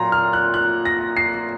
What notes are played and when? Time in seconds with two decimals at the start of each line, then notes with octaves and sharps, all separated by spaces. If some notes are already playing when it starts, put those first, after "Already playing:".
Already playing: A#2 F#3 A#3 A#5 C6
0.12 F6
0.33 F#6
0.54 F#6
0.85 A#6
1.17 C7